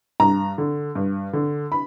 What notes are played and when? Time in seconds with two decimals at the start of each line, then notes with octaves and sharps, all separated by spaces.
0.20 G2 A#5
0.58 D3
0.95 G2
1.33 D3
1.72 B5